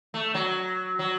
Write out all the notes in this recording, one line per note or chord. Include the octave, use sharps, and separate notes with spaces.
A3
F#3
F#3